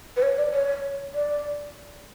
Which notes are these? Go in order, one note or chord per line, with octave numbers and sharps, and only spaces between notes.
B4
C#5
D5
C#5
D5